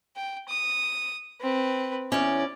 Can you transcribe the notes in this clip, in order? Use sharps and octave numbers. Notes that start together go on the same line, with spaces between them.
G5
D#6
C4 B4
E2 C#4 D5